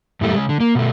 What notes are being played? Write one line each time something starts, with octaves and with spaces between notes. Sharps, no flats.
F#2 A2 G3 A3
C#3 G#3
D3
A#3
B2 A3